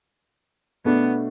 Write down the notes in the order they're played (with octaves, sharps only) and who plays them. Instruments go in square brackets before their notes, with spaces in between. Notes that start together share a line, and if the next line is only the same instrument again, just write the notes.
[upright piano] B2 A3 D4 [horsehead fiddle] B3